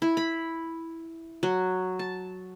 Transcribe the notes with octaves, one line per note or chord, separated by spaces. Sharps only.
E4
B5
F#3
A5